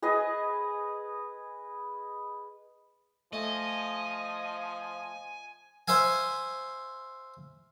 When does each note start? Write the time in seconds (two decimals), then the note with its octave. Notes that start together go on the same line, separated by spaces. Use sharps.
0.02 G#4 B4 D#5 G#5
3.33 F3 A3 D#5 G#5
5.88 C5 E5 F5 G#5